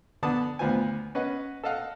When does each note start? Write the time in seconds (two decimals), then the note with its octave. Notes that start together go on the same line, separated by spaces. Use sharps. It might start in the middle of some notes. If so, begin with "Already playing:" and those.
0.23 D3 B3 A5 D#6
0.59 D2 B3 F4 C5 G#5
1.15 C#4 B4 D#5 F#5
1.64 A4 D#5 F5 F#5